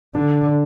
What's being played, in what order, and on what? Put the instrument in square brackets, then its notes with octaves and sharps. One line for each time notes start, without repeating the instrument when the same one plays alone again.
[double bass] D3 [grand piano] D4